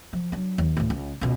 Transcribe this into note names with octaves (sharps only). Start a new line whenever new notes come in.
F3
F#3 D4
D#2
D2 A2
C#2
C#2 B2